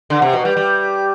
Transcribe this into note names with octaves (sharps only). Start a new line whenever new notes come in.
D3
C3
B2
G3
G3